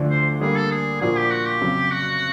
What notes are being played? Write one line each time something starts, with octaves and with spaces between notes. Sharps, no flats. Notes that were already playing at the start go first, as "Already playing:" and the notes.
Already playing: D2 D3 F3 A3 D4
C5
D3 G3 A#3 G#4
A4
G#4
A#2 F3 A#3 D4 F#4 G#4
G4
F#4
G4
F2 C#3 F#3
F#4